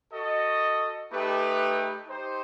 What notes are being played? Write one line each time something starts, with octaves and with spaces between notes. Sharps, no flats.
F#4 A4 D#5
A3 D#4 G4 B4
D#4 G4 C5